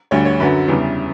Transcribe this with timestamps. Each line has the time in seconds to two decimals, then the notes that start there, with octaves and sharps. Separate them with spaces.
0.11 D2 D3 G3 C#5
0.25 C#5
0.40 F#2 D3 F#3 B4
0.68 E2 C#3 E3 G3